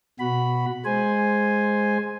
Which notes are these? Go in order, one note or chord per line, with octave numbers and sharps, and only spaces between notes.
B2 F#4 B5
G#3 C5 G#5